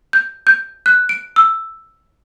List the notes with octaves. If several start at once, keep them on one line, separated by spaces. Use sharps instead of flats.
G6
G6
F#6
D7
E6